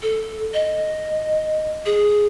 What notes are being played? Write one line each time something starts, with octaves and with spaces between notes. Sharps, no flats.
A4
D#5
G#4